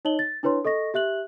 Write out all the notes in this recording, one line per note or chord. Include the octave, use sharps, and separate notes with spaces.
D#4 C#5 D#5 A5 F#7 G7
A6
D4 E4 B4 C#5 C6
A4 D#5 C#6 A#6
G4 E5 F#6 F#7